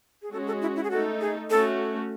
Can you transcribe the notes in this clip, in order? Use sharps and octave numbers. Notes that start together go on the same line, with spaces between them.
G#4
G#3 C#4 F#4 A4
A4
E4
E4
G#4
A3 D#4 F#4 A4
G#4
A3 C#4 F#4 A4